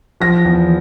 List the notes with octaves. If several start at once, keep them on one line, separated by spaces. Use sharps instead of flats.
F3 A#6
E2